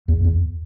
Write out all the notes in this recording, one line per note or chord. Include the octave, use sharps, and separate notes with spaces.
E2
E2